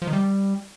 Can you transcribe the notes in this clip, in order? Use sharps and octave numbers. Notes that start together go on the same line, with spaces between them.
F3
D#3
G3